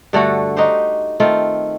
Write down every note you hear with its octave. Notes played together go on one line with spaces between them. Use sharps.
G2 D3 A3 F#4
D#4 F#4 G4 C5
D#3 A3 C4 F4